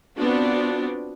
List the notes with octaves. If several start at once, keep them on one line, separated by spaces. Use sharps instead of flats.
B3 C4 D4 F4 F#4